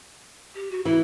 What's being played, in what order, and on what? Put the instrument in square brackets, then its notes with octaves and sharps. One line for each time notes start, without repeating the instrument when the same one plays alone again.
[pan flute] G4
F#4
[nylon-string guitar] E3 [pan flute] E4